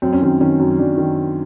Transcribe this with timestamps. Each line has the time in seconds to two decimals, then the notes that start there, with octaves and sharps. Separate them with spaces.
0.02 F#2 C4
0.13 C#4
0.21 D#3 C4
0.41 D#3 C#4
0.60 F#2
0.79 F#2 D4
0.98 D#3